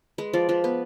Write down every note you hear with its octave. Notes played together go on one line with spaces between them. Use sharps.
G#3 B4
F3 D5
F3 B4
B3 B4